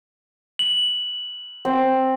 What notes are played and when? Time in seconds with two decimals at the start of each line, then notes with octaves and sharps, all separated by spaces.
0.59 F#7
1.65 C4